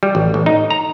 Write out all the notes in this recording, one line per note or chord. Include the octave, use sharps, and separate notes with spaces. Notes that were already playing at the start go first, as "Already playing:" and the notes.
G3
A1
A1
D#4
A#5